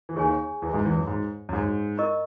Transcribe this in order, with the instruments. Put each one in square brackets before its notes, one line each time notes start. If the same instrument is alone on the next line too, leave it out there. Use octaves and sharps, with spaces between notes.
[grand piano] E3
[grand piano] D#2 D#3 [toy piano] G#4 C#5 G#5
[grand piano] E2 E3
G#2 G#3
E2 E3
F#2
G#2
F#2
G#2
[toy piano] E4 A#4 D#5 A#5 C#6